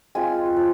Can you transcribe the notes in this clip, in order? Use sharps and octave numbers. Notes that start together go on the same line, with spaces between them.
G#3 C4 F4 G#5
F3